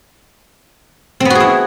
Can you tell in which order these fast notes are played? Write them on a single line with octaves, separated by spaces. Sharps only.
C4 B3 F#4 G#4 E4